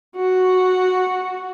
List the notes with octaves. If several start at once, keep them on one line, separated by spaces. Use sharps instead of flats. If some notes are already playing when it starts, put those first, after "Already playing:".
F#4